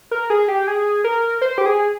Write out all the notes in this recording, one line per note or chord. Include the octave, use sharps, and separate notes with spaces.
A#4
G#4
G4
G#4
A#4
C5
G4
G#4